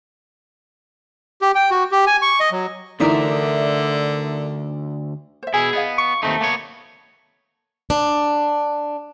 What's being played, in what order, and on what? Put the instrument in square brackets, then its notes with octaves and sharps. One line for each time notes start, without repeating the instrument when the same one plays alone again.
[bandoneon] G4
G5
F#4
G4
G#5
C#6
D#5
F#3
[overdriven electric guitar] D2 [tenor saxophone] D3 [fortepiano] E3 D#4 [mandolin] A#4 D5 E5
[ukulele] C5 E5
[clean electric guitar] B2 E4 [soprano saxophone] G#4 [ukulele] G#5
[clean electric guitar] B3 [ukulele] E4 D#5 F5
[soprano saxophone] C#6
[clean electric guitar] D#2 C4 D#4 [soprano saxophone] A3
[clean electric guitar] A#3 B3 C#5 [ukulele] A5
[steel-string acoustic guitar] D4